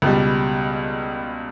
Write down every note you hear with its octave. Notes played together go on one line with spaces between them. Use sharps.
C#2 B2 G3